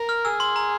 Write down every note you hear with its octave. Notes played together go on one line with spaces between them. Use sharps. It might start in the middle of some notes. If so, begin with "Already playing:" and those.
Already playing: A#4
F6
G#4 E6
C6
A#5